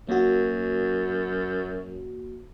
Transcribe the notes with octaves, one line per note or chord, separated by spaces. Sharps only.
F#2 A#3 F#4